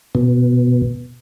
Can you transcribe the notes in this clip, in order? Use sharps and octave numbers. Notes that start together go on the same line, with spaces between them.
B2